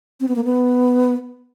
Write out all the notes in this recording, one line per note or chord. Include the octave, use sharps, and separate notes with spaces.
C4
B3
A#3
B3